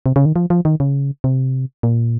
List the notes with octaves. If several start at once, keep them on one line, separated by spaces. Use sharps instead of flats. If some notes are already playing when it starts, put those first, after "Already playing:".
C3
C#3
D#3
F3
F3
D#3
C#3
C3
A#2